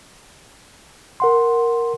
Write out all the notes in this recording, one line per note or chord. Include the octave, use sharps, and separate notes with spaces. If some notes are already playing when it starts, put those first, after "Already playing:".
A#4 F#5 C6